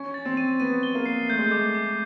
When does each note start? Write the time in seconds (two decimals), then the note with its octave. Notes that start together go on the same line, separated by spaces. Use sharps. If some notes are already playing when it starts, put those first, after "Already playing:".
Already playing: C#4
0.14 A6
0.25 C4
0.37 D#7
0.60 B3 D#7
0.83 G7
0.95 A#3
1.06 C7
1.29 A3 G6
1.38 G#3
1.46 A3
1.52 D6
1.75 D6